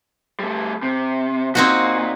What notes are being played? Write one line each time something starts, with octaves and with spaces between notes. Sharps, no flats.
G3 A3
C3
A#2 C4 D#4 F#4